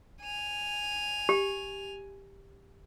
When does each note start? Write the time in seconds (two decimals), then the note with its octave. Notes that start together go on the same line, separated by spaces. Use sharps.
0.21 G#5 F7
1.29 G4